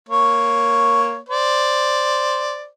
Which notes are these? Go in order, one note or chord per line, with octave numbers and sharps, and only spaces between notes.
A#3 C#5
C5 D5